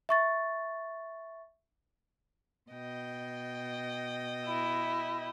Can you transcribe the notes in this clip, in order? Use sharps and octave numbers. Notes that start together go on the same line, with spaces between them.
E5 C#6 A6
B2 D#5 G5
E4